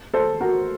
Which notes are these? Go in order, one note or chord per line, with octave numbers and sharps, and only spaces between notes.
A4 C5
F#4 A#4